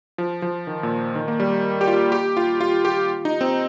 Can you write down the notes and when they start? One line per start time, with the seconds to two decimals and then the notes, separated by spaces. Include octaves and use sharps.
0.18 F3
0.42 F3
0.67 D#3
0.83 A#2
1.15 D#3
1.28 A#3
1.40 G3
1.81 G4
1.87 F4
2.12 G4
2.37 F4
2.61 F4
2.85 G4
3.25 D#4
3.41 C4